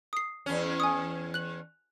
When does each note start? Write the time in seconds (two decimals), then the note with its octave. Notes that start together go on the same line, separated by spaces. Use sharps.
0.13 D#6 C7
0.46 E2 C#4
0.80 G#5 D#6
1.34 F#6 F#7